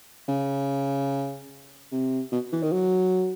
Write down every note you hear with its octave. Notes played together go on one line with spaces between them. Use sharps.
C#3
C3
B2
E3
D#3
F#3